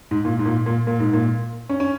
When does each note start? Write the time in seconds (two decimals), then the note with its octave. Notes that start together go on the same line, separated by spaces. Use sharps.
0.11 G#2
0.25 A#2
0.39 G#2
0.46 A#2
0.66 A#2
0.87 A#2
1.00 G#2
1.14 A#2
1.69 C#4
1.80 C#4